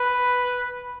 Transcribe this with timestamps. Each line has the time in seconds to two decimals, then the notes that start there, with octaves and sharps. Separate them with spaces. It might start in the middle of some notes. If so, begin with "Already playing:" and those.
Already playing: B4